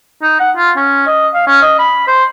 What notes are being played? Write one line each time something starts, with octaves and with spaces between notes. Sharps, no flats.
D#4
F#5
F4
C#4
D#5
F5
C#4
D#5
B5
C5